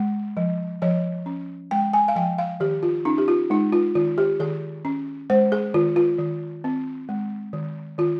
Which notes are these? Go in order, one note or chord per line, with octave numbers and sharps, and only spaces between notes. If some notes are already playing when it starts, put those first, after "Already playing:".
Already playing: G#3
F3
F3 C#5
C#4
G#3 G5
G#5
F5
F3 G5
F5
D#3 G4
F4
C#4 D#4
G4
F4
G#3 D#4
F4
D#3 F4
G4
D#3 G#4
C#4
G#3 C5
G#4
D#3 F4
F4
D#3
C4
G#3
D#3
D#3 F4